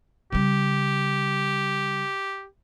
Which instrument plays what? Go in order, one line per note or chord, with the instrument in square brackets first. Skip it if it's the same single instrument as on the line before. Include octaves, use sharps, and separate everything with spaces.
[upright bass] C#3 G3 [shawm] G4